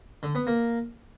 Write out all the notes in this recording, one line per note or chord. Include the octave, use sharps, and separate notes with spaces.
D3
B3
A#3